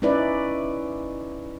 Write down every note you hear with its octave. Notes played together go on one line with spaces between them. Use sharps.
C#4 D#4 E4 B4 D5